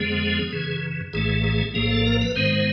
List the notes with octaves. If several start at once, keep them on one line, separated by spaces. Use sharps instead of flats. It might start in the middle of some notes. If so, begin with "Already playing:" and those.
Already playing: F2 D3 F3 G#3 B3 G#4
F#2 C#3 E3
A#1 A2 E3 A3 G#4
G#4
A#1 A2 F3 A#3 G#4
A4
A#4
B4
G#2 D#3 G#3 B3 C5